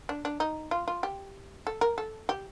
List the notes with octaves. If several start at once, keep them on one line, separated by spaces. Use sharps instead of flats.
D4
D4
D#4
F4
F4
G4
A4
A#4
A4
G4